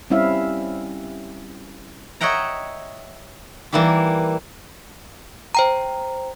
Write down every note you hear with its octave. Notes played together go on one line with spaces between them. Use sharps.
G3 C4 C#4 E4 E5 F5
C#5 D#5 E5 F#5 G5 A#5
E3 G3 A#3 E4 G4
C5 G5 A#5